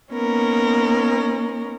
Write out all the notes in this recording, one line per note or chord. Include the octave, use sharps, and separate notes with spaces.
A#3 B3 C#4 D#4 A#4